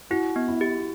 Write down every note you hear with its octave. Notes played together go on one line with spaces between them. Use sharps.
E4 F#4
B3
E4
G4